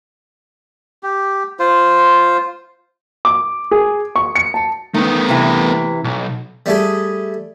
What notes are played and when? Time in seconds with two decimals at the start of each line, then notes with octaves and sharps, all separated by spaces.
1.03 G4
1.59 F4 C5
3.25 D6
3.71 G#4
4.16 C#6
4.35 C#7
4.54 A5
4.94 D#3 A3 B3
5.29 C3 E3
6.04 B1
6.66 G3 A3 G#4